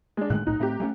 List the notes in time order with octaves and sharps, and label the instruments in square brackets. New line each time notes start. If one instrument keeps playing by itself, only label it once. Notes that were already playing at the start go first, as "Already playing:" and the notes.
[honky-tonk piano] G#3 D4
[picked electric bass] A2 D#3 G#3 [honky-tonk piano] F#6
[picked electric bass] B1 A2 [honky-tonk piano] D#4
[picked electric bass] A2 A3 C4 [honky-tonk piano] G4 A#5
[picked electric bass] G#3 A3 C#4